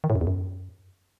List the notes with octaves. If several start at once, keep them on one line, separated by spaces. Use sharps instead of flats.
D#3
A2
F#2
E2
F#2